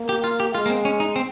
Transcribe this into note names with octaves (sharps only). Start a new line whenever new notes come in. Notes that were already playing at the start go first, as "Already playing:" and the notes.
Already playing: A#3
G4
F4
G4
G#3 F4
A#3
C4
C#4
D#4
C4